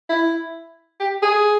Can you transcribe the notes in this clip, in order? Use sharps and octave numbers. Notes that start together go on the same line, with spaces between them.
E4
G4
G#4